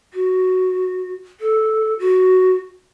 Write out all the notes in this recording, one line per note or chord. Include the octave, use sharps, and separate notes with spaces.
F#4
A4
F#4